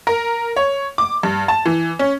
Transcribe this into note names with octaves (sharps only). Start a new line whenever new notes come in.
A#4
C#5
D6
G2
A5
E3
C#4